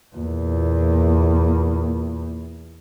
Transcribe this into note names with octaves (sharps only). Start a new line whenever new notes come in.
E2 A#2